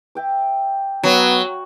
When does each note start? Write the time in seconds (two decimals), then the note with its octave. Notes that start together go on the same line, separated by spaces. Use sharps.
0.15 E5 G5 D6
1.04 F#3 B3